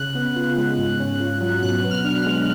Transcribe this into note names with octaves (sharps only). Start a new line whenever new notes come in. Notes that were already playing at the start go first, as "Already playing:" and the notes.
Already playing: C#3 F#6
B3
F4
G#3
G#2
C#4
F4
F#3
B2 F#6
B3
F6
D4
F6
G#3